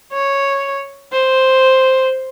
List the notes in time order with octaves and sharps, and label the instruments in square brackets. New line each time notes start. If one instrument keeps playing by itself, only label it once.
[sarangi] C#5
C5